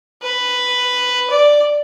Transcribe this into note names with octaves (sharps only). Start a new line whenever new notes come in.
B4
D5